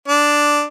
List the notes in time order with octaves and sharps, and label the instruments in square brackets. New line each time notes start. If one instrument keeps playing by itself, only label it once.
[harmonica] D4